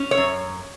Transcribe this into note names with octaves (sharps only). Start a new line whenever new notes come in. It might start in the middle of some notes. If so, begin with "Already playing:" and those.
Already playing: C#4
C#5
F#2